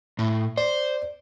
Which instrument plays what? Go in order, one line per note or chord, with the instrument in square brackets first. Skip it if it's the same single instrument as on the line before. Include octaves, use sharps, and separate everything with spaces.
[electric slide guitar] A2
[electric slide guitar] C5 [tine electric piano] D5